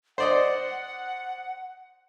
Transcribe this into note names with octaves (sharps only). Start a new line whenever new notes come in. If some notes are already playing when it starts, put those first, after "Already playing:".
C5 D5 D#5 F#5